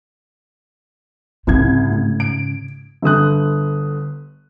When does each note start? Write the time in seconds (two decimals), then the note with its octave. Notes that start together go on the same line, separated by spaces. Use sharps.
1.47 C2 G#2 C#3 G#6
1.90 A2
2.20 D7
3.02 G1 D3 D#6 F#6